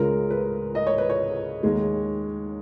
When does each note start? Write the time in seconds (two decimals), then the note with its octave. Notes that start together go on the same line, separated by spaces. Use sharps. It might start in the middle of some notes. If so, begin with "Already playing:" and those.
Already playing: C#2 C#3 G#3 A#4
0.30 B4
0.75 D#5
0.87 C#5
0.98 B4
1.10 C#5
1.63 D#2 D#3 G#3